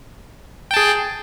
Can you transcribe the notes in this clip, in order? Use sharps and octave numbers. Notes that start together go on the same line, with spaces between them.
G#4 G5 A5